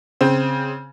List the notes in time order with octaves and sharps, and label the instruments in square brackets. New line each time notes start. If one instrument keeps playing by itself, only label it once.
[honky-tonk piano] C#3 C4